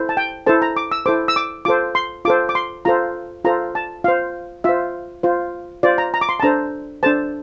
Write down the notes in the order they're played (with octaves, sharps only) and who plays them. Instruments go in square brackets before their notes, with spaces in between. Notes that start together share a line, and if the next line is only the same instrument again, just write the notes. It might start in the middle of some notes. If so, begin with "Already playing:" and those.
Already playing: [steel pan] E4 A4 C5
A5
G5
E4 A4 C5 A5
A#5
D6
E6
E4 A4 C5 D6
E6
D6
F4 A4 C5 D6
C6
F4 A4 C5 D6
D6
C6
F4 A4 C5 A#5
F4 A4 C5 A#5
A5
F4 C5 F5
F4 C5 E5
F4 C5
F4 C5 D5
A#5
A#5
D6
C6
A5
D4 A4 C5 A#5
D4 A4 C5 A5